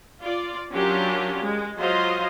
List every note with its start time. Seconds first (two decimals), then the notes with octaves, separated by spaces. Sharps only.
0.22 F4 D5
0.72 F#3 C#4 D4 F4 G4 A#4
1.42 G#3
1.78 F#3 F4 C5 D#5 F5 C6